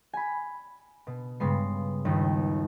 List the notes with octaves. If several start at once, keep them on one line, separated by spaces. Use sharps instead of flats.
G#5 B5
B2
G2 C#3 G#3 B3 C7
G1 D#2